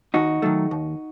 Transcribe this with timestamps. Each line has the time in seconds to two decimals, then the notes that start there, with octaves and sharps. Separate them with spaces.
0.14 D#2 D#4 F#4
0.42 D#3 F#3 A3
0.71 D#2